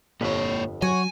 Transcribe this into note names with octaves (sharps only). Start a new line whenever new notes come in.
G1 F2 A#2 B4 C#5
F#3 F#4 C#5 G#5